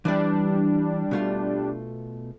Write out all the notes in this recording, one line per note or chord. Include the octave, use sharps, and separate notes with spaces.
E3 G3 D4 B4 D5
B2 A3 F4